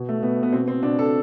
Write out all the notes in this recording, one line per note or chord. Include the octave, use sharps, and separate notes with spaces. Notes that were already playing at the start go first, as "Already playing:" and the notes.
Already playing: B2
A3
B2 B3
B3
B2 C4
C4
B2 D4
A4